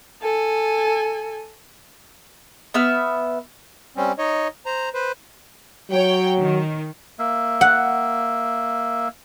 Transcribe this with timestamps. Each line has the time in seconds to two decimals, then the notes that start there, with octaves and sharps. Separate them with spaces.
0.22 A4 G#5
2.74 B3 E5 F6
3.97 G3 C4 C#4
4.18 D#4 C#5 D#5
4.66 C5 A#5
4.94 B4 C5
5.91 F#3 C#5 G5
6.38 D#3
7.19 A#3 E5
7.61 F#5